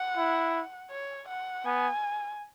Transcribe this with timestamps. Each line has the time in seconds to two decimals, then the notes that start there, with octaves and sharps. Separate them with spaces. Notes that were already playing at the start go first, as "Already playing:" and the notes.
Already playing: F#5
0.17 E4
0.91 C#5
1.29 F#5
1.66 B3 G#5